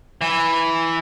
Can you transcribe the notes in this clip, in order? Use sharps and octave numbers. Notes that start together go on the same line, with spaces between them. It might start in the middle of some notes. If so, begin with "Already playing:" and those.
E3